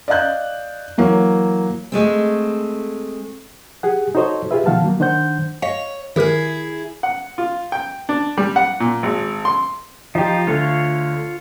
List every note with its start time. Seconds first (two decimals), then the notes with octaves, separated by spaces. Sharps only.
0.08 D5 D#5 F5 F#6 G6
0.98 E3 F#3 A#3
1.92 G#3 A3 C4
3.83 G4 G#4 F#5
4.15 D#4 F#4 A4 C5 C#5 D#5
4.51 F4 G4 G#4 B4 E5
4.66 B2 D#3 F3 F5 F#5 A5
4.84 F#3 A#3
5.00 D#3 D4 C5 F#5 G6
5.62 C#5 D#5 F5
6.16 D#3 E4 G4 G#4 A#4
7.03 F#5
7.38 F4
7.72 G5
8.09 D4
8.37 G3
8.56 F#5
8.80 A#2
9.03 G#1
9.45 C6
10.15 F3 D#4 F4 G4
10.47 D2 D3 F4 C#5 F5